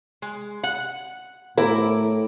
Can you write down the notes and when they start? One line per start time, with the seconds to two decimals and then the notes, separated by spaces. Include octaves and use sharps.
0.22 G#3
0.63 F#5
1.57 A2 E4 A#4 D6